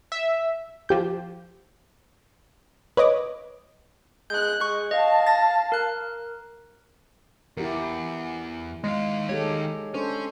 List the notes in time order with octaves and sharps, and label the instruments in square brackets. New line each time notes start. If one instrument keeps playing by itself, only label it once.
[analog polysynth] E5
[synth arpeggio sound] F3 G4 G6
B4 C#5 D#5 D6
[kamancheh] G#3 F#6 [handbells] G6
[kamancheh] G#3 [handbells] C#6 F#6
[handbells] D#5 [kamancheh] F5 A5
[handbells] A6 A#6
A#4 F#6
[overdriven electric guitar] E2 [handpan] E4 G4 A#4
[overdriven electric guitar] D#3 F5 [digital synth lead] G#3
[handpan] G#3 G4 A4 [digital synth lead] C#5
[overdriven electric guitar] C#4 [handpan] D4 A4 C5